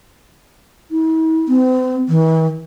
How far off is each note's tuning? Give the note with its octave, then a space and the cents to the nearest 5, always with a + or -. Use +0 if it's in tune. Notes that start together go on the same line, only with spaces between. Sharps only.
E4 -45
C4 -40
E3 -40